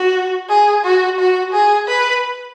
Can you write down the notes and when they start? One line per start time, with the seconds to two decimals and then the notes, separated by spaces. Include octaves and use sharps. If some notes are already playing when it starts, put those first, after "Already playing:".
Already playing: F#4
0.49 G#4
0.84 F#4
1.18 F#4
1.53 G#4
1.88 B4